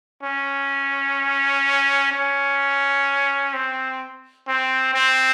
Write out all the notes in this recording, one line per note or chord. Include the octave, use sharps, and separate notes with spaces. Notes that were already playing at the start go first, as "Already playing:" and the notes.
C#4
C#4
C4
C4
C4